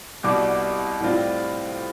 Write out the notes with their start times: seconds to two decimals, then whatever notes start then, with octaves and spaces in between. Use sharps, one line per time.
0.23 C2 B2 G3 D6
1.00 A2 G3 C4 F4